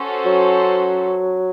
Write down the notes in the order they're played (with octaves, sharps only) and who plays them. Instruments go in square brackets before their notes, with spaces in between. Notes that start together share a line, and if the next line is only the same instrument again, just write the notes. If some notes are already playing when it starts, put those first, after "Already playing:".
Already playing: [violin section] C#4 F#4 A4 C5
[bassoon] F#3